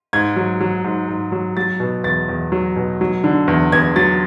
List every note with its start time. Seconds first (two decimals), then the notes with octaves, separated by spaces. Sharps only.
0.13 G#2 G#6
0.36 F#3
0.61 F#3
0.84 G#2
1.08 G#2
1.32 F#3
1.57 F#3 A6
1.80 B2
2.04 E2 A6
2.29 E2
2.52 F#3
2.76 B2
3.01 F#3
3.24 D3
3.48 E2
3.72 E2 G#6
3.96 F#3 A6